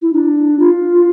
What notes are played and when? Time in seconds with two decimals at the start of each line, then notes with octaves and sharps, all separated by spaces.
0.02 E4
0.13 D4
0.59 F4